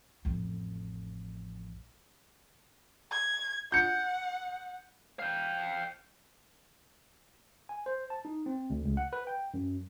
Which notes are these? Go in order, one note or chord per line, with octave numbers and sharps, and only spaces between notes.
A1 F2
G#6
F#5 G6 C#7
F5 G5
G#5
C5
A5
D#4
C4
D2
C#2
F#5
B4
G5
F#2